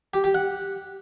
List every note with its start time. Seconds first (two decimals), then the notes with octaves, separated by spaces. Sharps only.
0.14 G4
0.24 G4
0.34 F#5